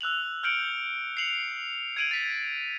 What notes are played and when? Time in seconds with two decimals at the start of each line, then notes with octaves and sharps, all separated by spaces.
0.01 E6 F#6 F7 F#7
0.43 F6 G6 C#7 D7 F#7
1.17 C7 C#7 F7 F#7
1.97 G#6 D7 D#7 F7 F#7
2.11 A6 B6